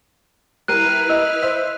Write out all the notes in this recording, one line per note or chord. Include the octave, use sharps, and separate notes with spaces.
G3 E4 A#4 B4 F6 F#6 C7 D#7
D#5 E6
C5 E5